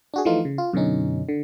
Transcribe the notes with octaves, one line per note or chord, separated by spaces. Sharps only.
D4 F#4 G#4
E3 F3 A3 D#4 F4
C#3
F4
F#2 B2 D3 C#4 D#4
D3